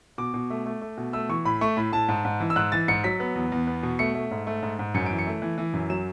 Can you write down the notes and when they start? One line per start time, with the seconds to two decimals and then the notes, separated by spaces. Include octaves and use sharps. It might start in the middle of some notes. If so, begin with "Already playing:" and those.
0.18 B2 D6
0.34 B2
0.50 A3
0.66 A3
0.81 A3
0.97 B2
1.13 A3 E6
1.29 E3 C#6
1.45 A2 B5
1.61 A3 C#6
1.77 A2 B5
1.92 A2 A5
2.08 G#2
2.25 G#2
2.40 E3
2.50 E6
2.56 G#2 F#6
2.72 E3 A6
2.88 G#2 C#7
3.04 F#3 B6
3.20 B3
3.35 E2
3.52 E2
3.67 B3
3.83 B2
3.99 A3 C#7
4.15 A3
4.31 G#2
4.47 A3
4.62 G#2
4.79 G#2
4.94 F#2 C#7
5.06 E3 D7
5.19 C#7
5.27 A3
5.42 E3
5.58 E3
5.73 F#2
5.90 F#3 E7